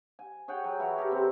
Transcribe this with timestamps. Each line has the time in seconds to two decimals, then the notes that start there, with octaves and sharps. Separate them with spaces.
0.19 G#5
0.48 G#4 C#5 F#5 G5
0.64 F#3
0.79 E3 E4 F#4 C#5
0.98 G4 A4 A#4
1.11 C3 C4